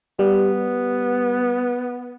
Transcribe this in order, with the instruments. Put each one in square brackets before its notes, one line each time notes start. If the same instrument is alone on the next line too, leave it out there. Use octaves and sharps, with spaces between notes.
[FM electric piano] G3 [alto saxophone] B3